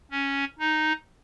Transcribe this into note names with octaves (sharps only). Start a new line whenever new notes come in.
C#4
D#4